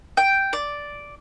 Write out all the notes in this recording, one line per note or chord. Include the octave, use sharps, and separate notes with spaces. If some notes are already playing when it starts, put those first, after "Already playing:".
G5
D5